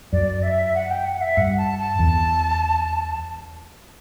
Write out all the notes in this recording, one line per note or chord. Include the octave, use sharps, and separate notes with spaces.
F#2 D5
E5
F#5
G5
F#5
E5
G2 F#5
A5
A5
E2